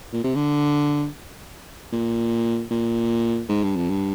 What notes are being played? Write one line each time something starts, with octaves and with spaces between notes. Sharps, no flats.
A#2
C3
D3
A#2
A#2
G#2
G2
F2
G2